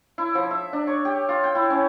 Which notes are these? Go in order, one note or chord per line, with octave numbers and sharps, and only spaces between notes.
E4
F3
E5
D4
C#5
G4
F4
G5
E4
C#4